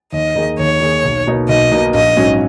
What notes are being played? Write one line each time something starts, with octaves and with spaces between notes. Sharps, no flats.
D#2 D#5
D#3 A#3 D#4 G#4
D#2 C#5
D#3 A#3 D#4 G#4
B1
B2 A#3 D#4
B1 D#5
B2 A#3 D#4
A#1 D#5
G#2 F#3 C#4